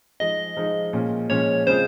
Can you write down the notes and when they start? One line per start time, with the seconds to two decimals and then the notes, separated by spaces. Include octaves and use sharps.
0.20 F3 G#3 D#4 G#4 D#5
0.57 F3 G#3 D#4 G#4
0.93 A#2 F3 G#3 C#4
1.29 A#2 F3 G#3 C#4 C#5
1.66 C#3 G#3 C4 F4 G#4 C5